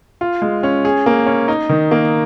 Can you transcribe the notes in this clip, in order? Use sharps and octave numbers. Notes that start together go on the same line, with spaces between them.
F4
G#3
C#4
G#4
A#3
C#4
D#4
D#3
A#3